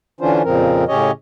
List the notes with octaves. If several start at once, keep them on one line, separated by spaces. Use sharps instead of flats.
D3 E3 C#4 D4 F4 C5
F2 A#2 C#3 F3 C4 A#4
A2 C#3 C#4 G4 C#5 D#5